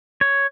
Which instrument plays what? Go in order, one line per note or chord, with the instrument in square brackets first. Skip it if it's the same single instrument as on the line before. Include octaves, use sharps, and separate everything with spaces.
[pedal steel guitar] C#5